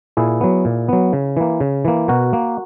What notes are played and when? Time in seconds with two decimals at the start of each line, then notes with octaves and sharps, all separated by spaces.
0.17 A#2 E4 G#4
0.41 F#3 B3
0.65 A#2
0.88 F#3 B3
1.13 C#3
1.37 E3 A#3
1.61 C#3
1.85 E3 A#3
2.08 B2 F#4 A#4
2.33 A#3